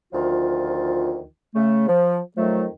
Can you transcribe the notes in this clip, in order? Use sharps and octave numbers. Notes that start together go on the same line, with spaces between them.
D2 D#3 F3 F4
C#3 A3
F3
F2 D#3 F3 F#3 A3